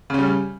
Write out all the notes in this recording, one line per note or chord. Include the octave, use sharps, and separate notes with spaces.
C#3 G3 C#4